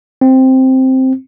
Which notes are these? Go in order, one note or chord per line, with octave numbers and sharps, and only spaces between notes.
C4